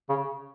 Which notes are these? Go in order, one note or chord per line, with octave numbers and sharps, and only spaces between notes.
C#3